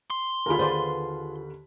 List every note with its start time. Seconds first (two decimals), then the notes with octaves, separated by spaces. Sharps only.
0.10 C6
0.46 D#2 D3 F4 G#4 A#4 B5
0.59 F4 G#4 B4 C5 D5